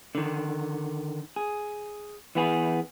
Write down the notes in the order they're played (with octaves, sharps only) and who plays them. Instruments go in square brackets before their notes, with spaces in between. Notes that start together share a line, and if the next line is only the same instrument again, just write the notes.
[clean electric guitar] D3 D#3
G#4
E3 B3 G#4